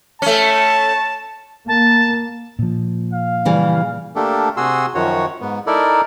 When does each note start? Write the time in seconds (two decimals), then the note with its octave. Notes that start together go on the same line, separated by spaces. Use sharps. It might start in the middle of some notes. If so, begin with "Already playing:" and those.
0.22 A3 C#4 A5
1.68 A#3 A5
2.59 A#2 F3
3.13 F5
3.45 C#3 E3 G3
4.16 A3 A#3 D4 G4 A4
4.57 C3 F#4 G#4 C6 E6
4.95 F#2 D#3 F3 F#4 C#5
5.41 G#2 B3
5.67 D#4 E4 A4 A#4 D5